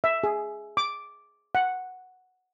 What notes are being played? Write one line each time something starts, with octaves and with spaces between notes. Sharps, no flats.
E5
G#4
D6
F#5